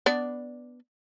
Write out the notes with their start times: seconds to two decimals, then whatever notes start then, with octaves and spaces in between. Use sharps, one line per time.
0.06 B3 D4 D5